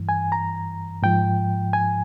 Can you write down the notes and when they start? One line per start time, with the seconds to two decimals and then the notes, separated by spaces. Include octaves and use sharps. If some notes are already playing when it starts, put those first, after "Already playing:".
Already playing: G2 E3
0.09 G#5
0.32 A#5
1.03 G#2 F3 G5
1.73 G#5